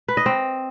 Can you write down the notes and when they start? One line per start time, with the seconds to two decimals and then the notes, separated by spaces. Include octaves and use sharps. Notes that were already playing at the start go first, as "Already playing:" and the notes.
0.08 B4
0.17 D#5
0.26 C4